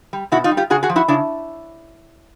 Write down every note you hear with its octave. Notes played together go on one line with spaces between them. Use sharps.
G3
B2 E4 F#4
D#4 F4
G3
F4 G4
C#3 F#4 G#4
F#4 G#4
F3
E4 F#4
C#3 D4 E4